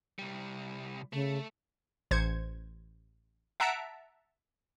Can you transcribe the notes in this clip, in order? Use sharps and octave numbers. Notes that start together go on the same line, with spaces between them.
C2 G3
C#3 A3
A1 C5 G#6 C#7
E5 F#5 A5 A#5 B6 D7